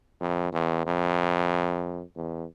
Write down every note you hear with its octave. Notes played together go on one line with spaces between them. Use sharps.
F2
E2
F2
E2